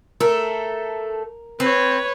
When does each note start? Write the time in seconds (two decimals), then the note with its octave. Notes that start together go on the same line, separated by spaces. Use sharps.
0.20 A3 A4 A#4
1.60 C4 B4 C#5